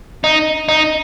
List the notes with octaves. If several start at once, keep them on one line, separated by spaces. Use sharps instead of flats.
D#4
D#4